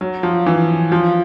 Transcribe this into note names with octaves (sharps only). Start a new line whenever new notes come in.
F#3
F3
E3
F3